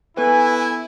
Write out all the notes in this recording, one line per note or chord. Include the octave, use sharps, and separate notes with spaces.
B3 E4 A4 B4 G#5